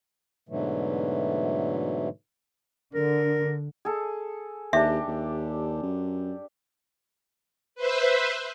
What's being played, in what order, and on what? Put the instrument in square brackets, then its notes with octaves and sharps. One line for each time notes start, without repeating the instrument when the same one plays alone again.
[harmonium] G#2 B2 D3 E3 F#3 A3
[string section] D3 [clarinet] A#4
[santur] G#4 A4
[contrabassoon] D#2 [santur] D4 G4 [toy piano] E5
[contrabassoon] D#2
F#2
[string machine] B4 C5 E5